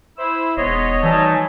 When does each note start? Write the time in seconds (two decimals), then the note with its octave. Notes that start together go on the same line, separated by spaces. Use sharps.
0.18 E4 C5 E6
0.57 E1 G#2 B3 C#5 D#5 C6
1.03 E3 F#3 G3 A3 D#4 G#5 A5